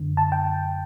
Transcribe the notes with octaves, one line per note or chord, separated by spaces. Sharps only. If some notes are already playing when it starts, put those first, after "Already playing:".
Already playing: F#2 D3
A5
G5